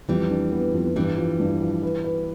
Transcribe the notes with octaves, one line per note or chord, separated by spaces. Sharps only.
F2 E3 G3
D4
B3
F2
G2 E3 G3
F3
G2
F3
B4
B4